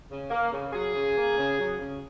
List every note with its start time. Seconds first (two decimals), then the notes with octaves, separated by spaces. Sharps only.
0.10 C#3
0.30 A#3
0.52 C#3
0.73 F#3 G#4
0.94 C#3
1.16 A#3
1.36 C#3
1.58 F#3
1.79 C#3